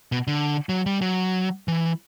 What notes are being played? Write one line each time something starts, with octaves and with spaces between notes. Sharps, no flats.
B2
D3
F#3
G3
F#3
E3